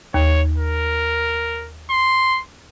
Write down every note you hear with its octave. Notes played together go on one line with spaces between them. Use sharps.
D#2 C#5
A#4
C6